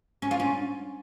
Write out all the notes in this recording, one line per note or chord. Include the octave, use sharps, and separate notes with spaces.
C#4
F4
C#4